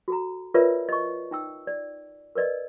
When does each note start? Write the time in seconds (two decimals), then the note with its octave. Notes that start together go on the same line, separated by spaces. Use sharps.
0.08 F#4 A4 A#5
0.54 F4 A#4 B4 C#5 D5 E5
0.89 D#5 C#6
1.31 D#4 G5 E6
1.67 D5
2.35 A#4 B4 D5 D#5